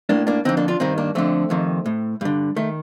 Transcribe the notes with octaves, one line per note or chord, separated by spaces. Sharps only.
A2 A#3 D4
A#3 D4
F2 D3 C4 D#4
A#3 D4
D4 F4
G2 D#3 C4 D#4
A#3 D4
F2 D3 A3 C4
F2 C3 D#3
A2
G2 D3
D#3 A3